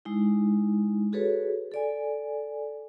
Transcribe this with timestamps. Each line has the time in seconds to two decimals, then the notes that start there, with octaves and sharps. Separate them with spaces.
0.05 G#3 D#4 E4
1.13 F#4 G#4 A4 B4 C#5
1.72 A4 D5 G#5